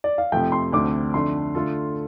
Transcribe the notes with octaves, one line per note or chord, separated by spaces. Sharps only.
D5
F5
F2 C3 F3 A3 G5
C6
D2 D3 A3 C4 D6
F2 D3 A3 D4 C6
D3 A3 F4 A4